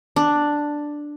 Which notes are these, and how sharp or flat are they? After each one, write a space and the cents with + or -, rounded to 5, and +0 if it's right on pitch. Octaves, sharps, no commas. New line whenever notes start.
D4 +5